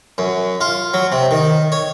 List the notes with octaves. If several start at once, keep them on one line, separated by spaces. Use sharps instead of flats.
F#2
F4
F#3
C3
D#3
C#5